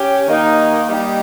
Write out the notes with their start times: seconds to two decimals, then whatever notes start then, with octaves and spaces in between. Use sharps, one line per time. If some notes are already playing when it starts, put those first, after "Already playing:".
Already playing: C#4 G4
0.26 D#3 A#3 D#4 G4
0.88 G3 A#3 D#4 G4